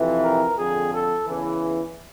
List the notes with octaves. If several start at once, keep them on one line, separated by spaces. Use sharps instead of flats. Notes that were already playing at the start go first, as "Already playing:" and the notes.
Already playing: F2 C3 E3
A#4
F2 D3 G#4
A4
E2 C#3 E3